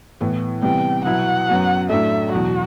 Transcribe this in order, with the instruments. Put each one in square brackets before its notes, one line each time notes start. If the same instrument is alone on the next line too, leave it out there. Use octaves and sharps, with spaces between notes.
[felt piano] A2 E3 B3
[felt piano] C3 E3 G3 B3 [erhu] G5
[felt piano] B2 F#3 B3 E4 [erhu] F#5
[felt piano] F#2 F#3 B3 F#4
[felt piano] A2 F#3 A3 D4 [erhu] E5
[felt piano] E2 B2 F#3 [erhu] F#4